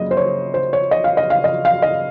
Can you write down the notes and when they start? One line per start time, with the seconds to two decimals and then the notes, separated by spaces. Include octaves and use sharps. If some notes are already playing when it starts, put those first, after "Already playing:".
Already playing: F#2 C#3 F#3 A#3 D#5
0.11 C5
0.17 C#5
0.54 C5
0.73 C#5
0.91 D#5
1.04 F5
1.17 D#5
1.30 F5
1.44 D#5
1.65 F5
1.82 D#5